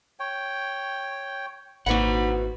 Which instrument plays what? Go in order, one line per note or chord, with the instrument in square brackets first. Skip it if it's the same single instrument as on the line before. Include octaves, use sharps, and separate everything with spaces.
[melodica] C#5 G5
[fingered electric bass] G#1 A#3 [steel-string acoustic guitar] C3 E3 F#4 [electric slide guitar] D#4 F#5 [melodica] B5